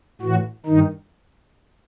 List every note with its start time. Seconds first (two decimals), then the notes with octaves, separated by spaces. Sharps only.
0.21 A2 E3 F#4
0.66 G2 D#3 D#4